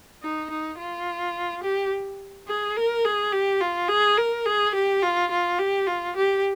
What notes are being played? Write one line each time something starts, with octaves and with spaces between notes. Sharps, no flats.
D#4
D#4
F4
G4
G#4
A#4
G#4
G4
F4
G#4
A#4
G#4
G4
F4
F4
G4
F4
G4